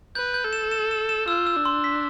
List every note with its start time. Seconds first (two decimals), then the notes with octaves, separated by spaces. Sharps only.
0.15 B4 G6
0.34 G6
0.44 A4
0.53 E7
0.71 E7
0.91 E7
1.09 E7
1.28 F4 E6
1.47 E6
1.56 D4
1.65 C6
1.84 B6